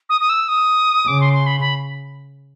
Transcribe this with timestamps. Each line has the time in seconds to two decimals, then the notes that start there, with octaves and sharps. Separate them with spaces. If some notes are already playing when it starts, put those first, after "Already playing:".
0.09 D#6
0.21 D#6
0.29 E6
0.48 D#6
1.08 C#3 D6
1.21 C6
1.33 C6
1.47 B5
1.60 B5